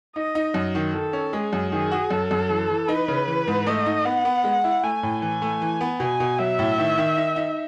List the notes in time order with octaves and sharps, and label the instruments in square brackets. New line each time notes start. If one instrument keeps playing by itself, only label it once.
[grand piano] D#4 [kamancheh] D#5
[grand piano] D#4
F#2
D#3
[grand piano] D#3 [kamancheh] A4
[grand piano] C#4
[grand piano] G#3 [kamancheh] G#4
[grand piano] F#2
[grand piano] D#3 [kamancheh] G#4
[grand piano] F#4
[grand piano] F#2 [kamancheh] A4
[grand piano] F#2
E3
E3
[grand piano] D#4 [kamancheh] B4
[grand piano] C#3
E3
G#2
[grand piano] A3 [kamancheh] D#5
[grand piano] D#4
[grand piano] B3 [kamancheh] F#5
[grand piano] B3
G#3
E4
[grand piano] A3 [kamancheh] G#5
[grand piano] A2
[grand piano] E3 [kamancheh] G#5
[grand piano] A3
E3
B3
[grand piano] B2 [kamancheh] G#5
[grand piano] B2
[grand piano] F#3 [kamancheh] E5
[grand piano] A2
D#3
D#3
D#4
D#4